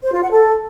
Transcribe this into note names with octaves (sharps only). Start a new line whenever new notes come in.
C5
F4
F#5
A4